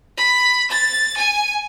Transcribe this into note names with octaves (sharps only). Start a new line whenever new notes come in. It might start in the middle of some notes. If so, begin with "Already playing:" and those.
B5
A6
G#5